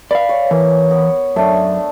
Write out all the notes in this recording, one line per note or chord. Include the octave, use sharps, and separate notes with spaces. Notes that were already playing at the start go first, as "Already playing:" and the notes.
B4 D5 F5
C#5
E3 A#3
B3
F#2 A3 D4